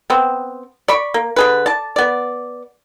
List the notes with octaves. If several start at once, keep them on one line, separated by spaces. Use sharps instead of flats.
B3 C4
D5 B5 C#6
A#3
D3 G#4 B4
D5 A5
B3 D5